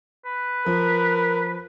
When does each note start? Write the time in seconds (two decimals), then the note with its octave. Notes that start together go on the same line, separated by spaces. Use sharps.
0.25 B4
0.66 F3 A#4